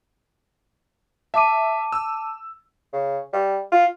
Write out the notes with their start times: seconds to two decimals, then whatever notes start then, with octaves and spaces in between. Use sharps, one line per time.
1.34 E5 A5 D6 D#7
1.92 E6
2.93 C#3
3.33 G3
3.72 F4